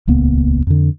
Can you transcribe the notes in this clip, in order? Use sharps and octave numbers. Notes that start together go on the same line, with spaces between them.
D#1 C#2 A#3 B3
F2 D3